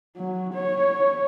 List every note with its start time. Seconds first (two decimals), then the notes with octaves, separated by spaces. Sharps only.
0.16 F#3
0.54 C#5